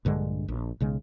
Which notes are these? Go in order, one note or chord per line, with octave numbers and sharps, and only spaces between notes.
A#1 G2 D3 G#3
A#1
B1 C#3 G#3